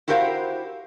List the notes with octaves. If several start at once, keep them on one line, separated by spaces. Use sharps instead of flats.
E4 F#4 G4 A#4 C5 F5